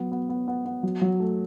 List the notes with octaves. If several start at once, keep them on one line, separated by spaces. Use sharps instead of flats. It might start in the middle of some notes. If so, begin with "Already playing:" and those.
Already playing: F#3 B3
B3
B3
B3
B3
F#3
F#3
A3